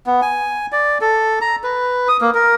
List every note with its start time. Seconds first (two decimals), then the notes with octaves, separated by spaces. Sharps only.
0.07 B3
0.22 G#5
0.72 D5
1.01 A4
1.41 A#5
1.64 B4
2.08 D#6
2.21 A#3
2.35 A#4